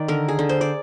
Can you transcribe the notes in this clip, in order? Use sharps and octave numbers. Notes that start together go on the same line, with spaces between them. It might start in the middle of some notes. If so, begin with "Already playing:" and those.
Already playing: D#3 D5
D3 A#4
G#4
D3
C5
D5